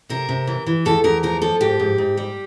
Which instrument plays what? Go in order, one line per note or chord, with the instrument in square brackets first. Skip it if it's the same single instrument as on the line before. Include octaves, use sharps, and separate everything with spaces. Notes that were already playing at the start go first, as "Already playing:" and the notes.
[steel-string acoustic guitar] C3 A#4
C3
E3
E3
E2 A4
E2 A#4
F3 A#4
F3 A4
G#2 G4
G#2
G#2
G3